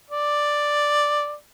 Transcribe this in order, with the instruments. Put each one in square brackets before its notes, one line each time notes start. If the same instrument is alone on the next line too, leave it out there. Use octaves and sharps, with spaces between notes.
[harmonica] D5